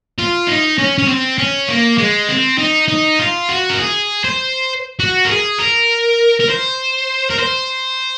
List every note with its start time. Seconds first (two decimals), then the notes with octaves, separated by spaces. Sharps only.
0.18 F4
0.48 D#4
0.78 C#4
0.98 C#4
1.08 C4
1.38 C#4
1.69 A#3
1.98 G#3
2.29 C4
2.58 D#4
2.88 D#4
3.19 F4
3.49 F#4
3.70 A#4
3.78 G#4
4.24 C5
4.99 F#4
5.25 A#4
5.28 G#4
5.59 A#4
6.40 A#4
6.50 C5
7.30 A#4
7.39 C5